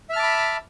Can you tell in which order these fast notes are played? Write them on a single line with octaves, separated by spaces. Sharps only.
E5 F6 A5 D6 B5